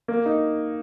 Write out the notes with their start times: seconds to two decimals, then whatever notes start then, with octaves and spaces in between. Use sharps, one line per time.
0.08 A#3
0.26 D#4